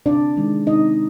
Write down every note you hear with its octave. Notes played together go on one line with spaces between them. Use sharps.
C3 D4 D5
D#3 G#3
C3 D#4 D#5